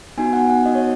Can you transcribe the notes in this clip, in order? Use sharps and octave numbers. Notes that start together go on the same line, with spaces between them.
B3 D#4 F#4 G#5
F#5
F#5
B3 D#4 F#4 D#5
C#5